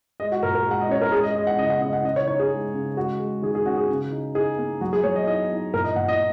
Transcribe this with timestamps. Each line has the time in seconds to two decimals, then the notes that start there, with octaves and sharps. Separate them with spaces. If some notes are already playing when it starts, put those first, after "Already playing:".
0.20 G#3 D#5
0.32 F#4
0.43 A#2 A#4
0.55 A#4
0.66 G#3 F#5
0.81 D#5
0.89 C#4 C#5
1.02 A#4
1.12 G#3 G#4
1.23 D#5
1.35 G#3 D#5
1.47 F#5
1.58 C#3 D#5
1.70 F#5
1.81 C#3 D#5
1.93 F#5
2.05 C#3 D#5
2.16 C#5
2.27 D#4 C#5
2.39 G#4
2.50 G#3
2.74 C#3
2.97 G#3 F#4
3.20 G#3
3.42 D#3 G#4
3.55 G#4
3.66 C#4 F#4
3.77 G#4
3.89 C#3
4.12 D#4
4.34 D#4 G#4
4.58 A#3
4.81 F#3 F#4
4.93 G#4
5.04 F#3 C#5
5.16 D#5
5.27 D#4 D#5
5.50 D#4
5.73 A#2 A#4
5.84 D#5
5.96 A#2 F#5
6.08 D#5